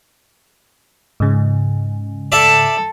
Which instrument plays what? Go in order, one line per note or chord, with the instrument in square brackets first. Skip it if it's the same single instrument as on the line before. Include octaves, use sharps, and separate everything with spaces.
[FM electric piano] G#2 C#3
[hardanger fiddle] A4 [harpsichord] D5 E5 A5